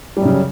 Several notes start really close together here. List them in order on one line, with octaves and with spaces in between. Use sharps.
G3 F#2 C#3